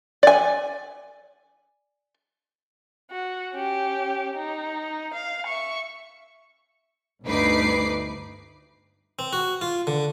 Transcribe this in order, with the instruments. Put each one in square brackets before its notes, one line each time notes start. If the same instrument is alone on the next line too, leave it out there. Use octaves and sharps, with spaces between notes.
[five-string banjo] D5 G#5
[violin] F#4
C#4 G4
D#4
F5
E5 C#6
[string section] G1 D2 D#4 B4 D6 C7
[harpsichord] C4
F#4
F4
D3